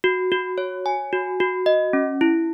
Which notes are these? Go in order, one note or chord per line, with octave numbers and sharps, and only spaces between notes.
F#4
F#4
C#5
G#5
F#4
F#4
D#5
C#4
E4